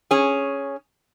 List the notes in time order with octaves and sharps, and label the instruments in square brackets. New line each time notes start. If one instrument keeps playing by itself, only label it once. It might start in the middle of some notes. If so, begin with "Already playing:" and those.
[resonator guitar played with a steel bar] C#4 G#4